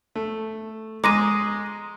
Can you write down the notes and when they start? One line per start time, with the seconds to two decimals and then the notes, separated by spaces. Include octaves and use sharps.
0.16 A3
1.04 G#3 A#5 C6 D6 D#6 A#6 D#7